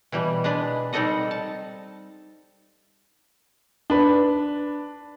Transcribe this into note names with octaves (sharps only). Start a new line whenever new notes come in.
B2 E3 G3 G4
G#3 D4 B4
G3 C4 D#4 A4 D#5 F#5
A5
D4 B4